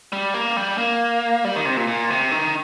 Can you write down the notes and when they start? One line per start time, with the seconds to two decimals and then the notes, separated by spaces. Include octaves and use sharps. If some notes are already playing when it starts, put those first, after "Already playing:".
0.13 G3
0.34 A#3
0.57 G3
0.78 A#3
1.45 G3
1.56 D#3
1.66 C3
1.77 A#2
1.88 A#2
2.10 C3
2.31 D#3